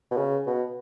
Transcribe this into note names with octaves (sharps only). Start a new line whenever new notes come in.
B2
C#3
B2